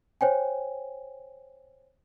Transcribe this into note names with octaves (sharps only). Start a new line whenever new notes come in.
C5 C#5 G5 G#5